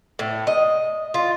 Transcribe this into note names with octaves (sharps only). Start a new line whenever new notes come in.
A2
D#5
F4